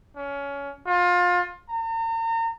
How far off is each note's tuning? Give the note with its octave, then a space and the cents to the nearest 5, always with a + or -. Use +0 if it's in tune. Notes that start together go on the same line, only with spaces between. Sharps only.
C#4 +20
F4 +25
A#5 -40